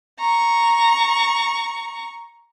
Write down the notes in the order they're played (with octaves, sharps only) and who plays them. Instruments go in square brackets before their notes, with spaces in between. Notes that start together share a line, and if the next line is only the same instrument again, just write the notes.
[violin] A#5 C#6